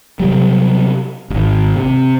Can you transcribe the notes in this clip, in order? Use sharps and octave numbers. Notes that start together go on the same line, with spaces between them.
C3 F#3 G3
D#1 G#1
C3